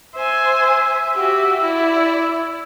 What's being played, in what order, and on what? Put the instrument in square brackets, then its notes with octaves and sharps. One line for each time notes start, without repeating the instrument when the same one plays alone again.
[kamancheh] C5 G#5 [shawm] E5
[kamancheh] F#4 G4
E4 D5